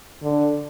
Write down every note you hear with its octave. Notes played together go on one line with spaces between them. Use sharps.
D3